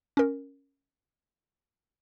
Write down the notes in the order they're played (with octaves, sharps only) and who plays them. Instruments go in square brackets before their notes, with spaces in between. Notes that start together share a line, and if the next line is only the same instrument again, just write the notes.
[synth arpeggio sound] C#4 A#4